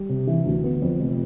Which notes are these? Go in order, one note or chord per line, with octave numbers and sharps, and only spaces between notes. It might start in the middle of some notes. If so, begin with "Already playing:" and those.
Already playing: G3
C3
E3
D2
B3
F2
F1